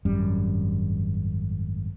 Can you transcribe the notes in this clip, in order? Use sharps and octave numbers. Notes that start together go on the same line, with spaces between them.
G#1 F#2 G3 C#4